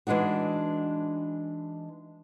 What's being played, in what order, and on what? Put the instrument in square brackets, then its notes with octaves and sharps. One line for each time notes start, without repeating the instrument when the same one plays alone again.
[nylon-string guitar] E3 G#3 D4 D#4 F#4